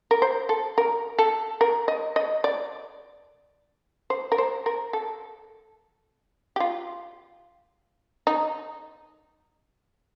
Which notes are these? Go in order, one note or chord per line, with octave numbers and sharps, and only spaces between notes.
A#4
C5
A4
A#4
A4
A#4
D#5
D#5
D5
C5
A#4
C5
A#4
A4
G4
F4
D#4